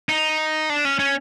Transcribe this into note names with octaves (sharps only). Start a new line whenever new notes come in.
D#4
D4
C#4
C#4